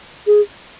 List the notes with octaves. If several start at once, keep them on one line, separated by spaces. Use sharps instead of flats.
G#4